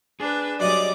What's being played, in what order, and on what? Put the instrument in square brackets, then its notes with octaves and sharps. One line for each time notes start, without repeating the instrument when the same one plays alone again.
[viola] D4 B4 [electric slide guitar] G#4
[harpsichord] F#2 D#5 D#6 [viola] G3 D6 [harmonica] D5